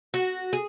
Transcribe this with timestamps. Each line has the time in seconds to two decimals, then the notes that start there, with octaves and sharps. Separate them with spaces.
0.14 F#4
0.53 G#4